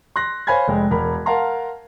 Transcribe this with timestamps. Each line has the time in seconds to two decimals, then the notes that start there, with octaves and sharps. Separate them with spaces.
0.16 C6 F#6 A#6
0.47 C5 C#5 F5 G#5 B5 G#6
0.68 F1 G#3 G5
0.91 E1 A#4 A#5 B5
1.26 A#4 F5 F#5 A5 A#5 C6